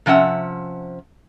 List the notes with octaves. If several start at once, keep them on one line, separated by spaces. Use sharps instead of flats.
C3 F3 C#4 E5 F#5